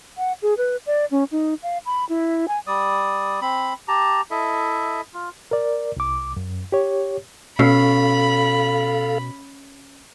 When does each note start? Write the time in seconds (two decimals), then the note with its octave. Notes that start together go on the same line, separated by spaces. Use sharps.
0.18 F#5
0.42 G#4
0.57 B4
0.86 D5
1.11 C#4
1.32 D#4
1.63 F5
1.86 B5
2.09 E4
2.48 G#5
2.67 G3 D5 D#6
3.41 C4 B5
3.88 G4 A5 A#5
4.31 E4 A4 D#5 E5
5.14 F4
5.51 A#4 D5
5.97 C2 D6
6.37 F#2
6.72 G4 C#5
7.59 B2 C#4 A4 F5 B5